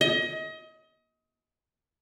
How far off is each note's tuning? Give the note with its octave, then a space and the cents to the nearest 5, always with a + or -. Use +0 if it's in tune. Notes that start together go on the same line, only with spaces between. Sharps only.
D#5 +30